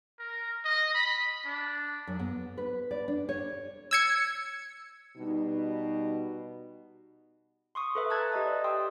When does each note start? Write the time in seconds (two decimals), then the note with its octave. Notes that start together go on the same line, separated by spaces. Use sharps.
0.19 A#4
0.65 D#5
0.94 B5
1.46 D4
2.07 F#2
2.19 B3
2.58 B4
2.91 D5
3.08 D4
3.29 C#5
3.91 E6 G#6 C#7
5.18 B2 G3 D#4
7.75 C6 C#6 D#6
7.95 A4 B4 E5
8.10 A5 A#5 E6 F#6 G#6 A6
8.32 G4 D#5 E5 D#6
8.46 D5
8.64 G5 C6 D#6 E6